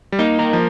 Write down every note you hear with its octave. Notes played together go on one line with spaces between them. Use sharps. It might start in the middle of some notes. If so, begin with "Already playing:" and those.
G3
A#3 D#4
A#4
F3